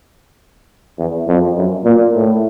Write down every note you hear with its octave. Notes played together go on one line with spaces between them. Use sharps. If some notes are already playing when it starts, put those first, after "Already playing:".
E2
F2
F#2
A#2
A2